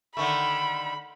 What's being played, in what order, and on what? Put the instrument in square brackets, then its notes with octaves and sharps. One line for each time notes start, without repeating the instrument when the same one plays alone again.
[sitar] D3 D#3 A3 [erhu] B5